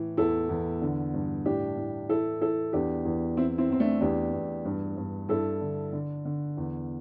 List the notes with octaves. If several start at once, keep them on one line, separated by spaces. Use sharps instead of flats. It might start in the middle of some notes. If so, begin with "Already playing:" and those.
Already playing: A2 E3
E2 E4 A4
E2
D3
G2
A2 D4 G4
A2
E3 E4 A4
E3 E4 A4
E2 D4 G4
E2
E3 C4 E4
C4 E4
E2 C4
A3 D4
E2 D4 G4
E2
G2
G2
G2 E4 A4
D3
D3
D3
E2